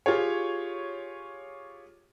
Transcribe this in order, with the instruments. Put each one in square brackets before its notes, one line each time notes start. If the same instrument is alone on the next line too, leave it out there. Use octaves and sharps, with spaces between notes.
[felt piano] F4 G4 G#4 C#5